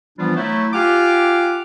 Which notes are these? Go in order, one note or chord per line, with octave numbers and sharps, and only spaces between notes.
E3 F3 G3 B3 D4 F4
F#3 A3 E4
F4 G4 F#5 G#5 D6 F6